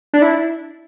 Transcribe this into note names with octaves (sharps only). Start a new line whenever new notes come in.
D4
E4